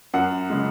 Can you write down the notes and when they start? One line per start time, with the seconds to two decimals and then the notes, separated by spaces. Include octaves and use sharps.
0.14 F#2 F#5
0.50 C#3 G#3